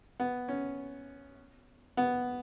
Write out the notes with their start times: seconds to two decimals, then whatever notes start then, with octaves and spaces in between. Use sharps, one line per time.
0.20 B3
0.48 C#4
1.97 B3